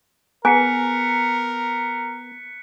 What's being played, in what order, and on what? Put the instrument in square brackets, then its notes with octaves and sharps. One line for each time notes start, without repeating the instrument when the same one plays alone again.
[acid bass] B3 [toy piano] G#4 G#5 A#5 [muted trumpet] A#4 [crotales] F#6 B6 C#7